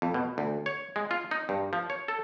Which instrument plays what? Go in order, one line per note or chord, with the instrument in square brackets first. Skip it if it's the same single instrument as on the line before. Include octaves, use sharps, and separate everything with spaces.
[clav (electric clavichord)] F2
B2
D2
C#5
G#3
F4
D#4
G2
F3
C#5
A4